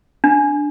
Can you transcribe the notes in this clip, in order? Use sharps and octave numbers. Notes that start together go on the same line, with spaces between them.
D4